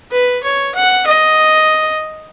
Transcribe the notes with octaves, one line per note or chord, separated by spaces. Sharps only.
B4
C#5
F#5
D#5